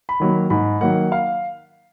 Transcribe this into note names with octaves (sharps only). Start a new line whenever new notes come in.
B5
D#3 F#3 A#3
G#2 B5
D#3 F#3 A#3 F#5
F5